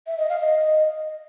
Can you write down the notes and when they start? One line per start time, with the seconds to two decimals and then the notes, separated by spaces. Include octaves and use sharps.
0.07 E5
0.18 D#5
0.29 F5
0.40 D#5